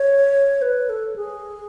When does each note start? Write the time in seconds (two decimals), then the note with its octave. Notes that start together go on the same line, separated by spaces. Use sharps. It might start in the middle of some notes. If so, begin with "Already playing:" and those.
Already playing: C#5
0.62 B4
0.89 A4
1.16 G#4